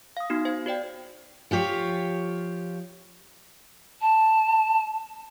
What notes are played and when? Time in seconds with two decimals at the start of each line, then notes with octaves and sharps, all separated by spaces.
0.17 F5 D#6
0.30 B3 D#4 F#4
0.45 C5 F5 G#6
0.66 F#4 C5 D5 G5
1.51 F3 F4 G4 C#5
4.02 A5